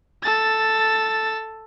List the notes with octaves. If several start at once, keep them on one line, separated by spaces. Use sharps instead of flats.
A4 A6